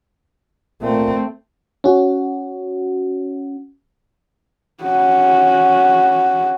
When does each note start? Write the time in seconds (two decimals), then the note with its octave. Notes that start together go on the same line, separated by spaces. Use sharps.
0.82 A#2 A3 C4
1.84 C#4 F#4
4.83 C#4 F#4